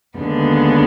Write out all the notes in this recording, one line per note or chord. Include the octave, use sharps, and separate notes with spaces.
D#2 D3 G#3 B3